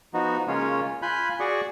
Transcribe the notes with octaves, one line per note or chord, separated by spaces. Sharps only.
F3 B3 D#4 F#4
C#3 G#3 A#3 C#4 F4 C#5
F4 G#5 B5 F#6 G6
F#4 G#4 D5 F#5 C#6